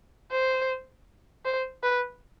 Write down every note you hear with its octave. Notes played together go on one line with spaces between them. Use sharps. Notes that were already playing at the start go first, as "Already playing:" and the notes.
C5
C5
B4